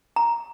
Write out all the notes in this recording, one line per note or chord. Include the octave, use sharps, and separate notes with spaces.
A#5